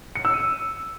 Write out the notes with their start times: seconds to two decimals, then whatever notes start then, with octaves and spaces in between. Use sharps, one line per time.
0.15 C#7
0.25 E6
0.34 D#7